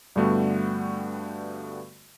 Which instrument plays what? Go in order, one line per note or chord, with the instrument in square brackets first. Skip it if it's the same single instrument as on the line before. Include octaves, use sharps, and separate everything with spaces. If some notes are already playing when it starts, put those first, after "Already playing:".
[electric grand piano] G2 D3 G3 A3 B3 F#4